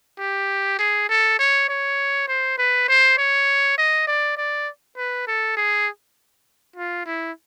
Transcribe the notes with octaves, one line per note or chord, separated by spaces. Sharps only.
G4
G#4
A4
C#5
C#5
C5
B4
C5
C#5
D#5
D5
D5
B4
A4
G#4
F4
E4